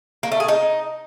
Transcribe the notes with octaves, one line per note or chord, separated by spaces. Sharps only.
A#3
A3
G#4
D#4